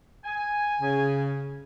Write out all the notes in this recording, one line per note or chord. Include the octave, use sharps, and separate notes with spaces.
G#5
C#3